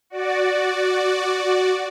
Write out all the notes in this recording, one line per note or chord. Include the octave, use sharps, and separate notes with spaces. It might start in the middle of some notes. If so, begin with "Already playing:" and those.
F#4 D5